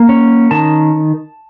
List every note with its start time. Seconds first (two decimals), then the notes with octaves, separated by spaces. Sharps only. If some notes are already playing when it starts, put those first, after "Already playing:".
Already playing: A#3
0.09 C#4
0.51 D#3 A5